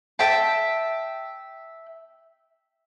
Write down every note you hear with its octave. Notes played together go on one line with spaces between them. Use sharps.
E5 G5 A5